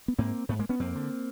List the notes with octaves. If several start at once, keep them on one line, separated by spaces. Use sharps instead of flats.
B3
G#2 A#3 C4
G#2 A3 B3
G#3 A#3
B3 C#4
F2 A#3 C4
D3